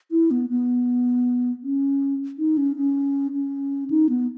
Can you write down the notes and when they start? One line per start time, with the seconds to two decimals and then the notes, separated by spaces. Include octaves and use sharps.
0.11 E4
0.31 B3
0.50 B3
1.63 C#4
2.39 D#4
2.57 C#4
2.76 C#4
3.33 C#4
3.90 D#4
4.09 B3